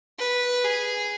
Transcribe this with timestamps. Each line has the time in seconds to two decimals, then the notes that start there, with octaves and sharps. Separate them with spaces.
0.18 B4
0.64 G#4